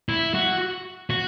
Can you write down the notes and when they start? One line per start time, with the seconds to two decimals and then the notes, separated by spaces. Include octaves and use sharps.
0.09 E4
0.34 F#4
1.10 F#4